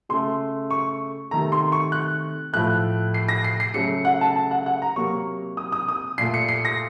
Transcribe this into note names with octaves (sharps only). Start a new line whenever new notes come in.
C#3 A3 C6
C#6
C3 D#3 A3 A#5
C6
C#6
F#6
A2 F3 A3 F#6
C7
A#6
C7
C7
C#3 F#3 A3 C#7
F#5
A5
A5
F#5
F#5
A#5
C3 F#3 A#3 C#6
D#6
D#6
D#6
A#2 A3 C7
C#7
C7
A#6